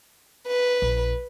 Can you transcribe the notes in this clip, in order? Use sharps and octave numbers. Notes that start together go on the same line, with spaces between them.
B4
A#1